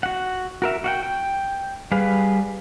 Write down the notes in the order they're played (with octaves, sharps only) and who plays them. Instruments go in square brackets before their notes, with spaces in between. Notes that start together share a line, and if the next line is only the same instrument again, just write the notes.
[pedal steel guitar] F#4 F#5
F#4 A#4 E5
F#4 F5 G5
G5
G3 G#4 B4 F5